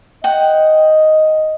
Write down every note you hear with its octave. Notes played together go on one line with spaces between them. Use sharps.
D#5 F#5 G5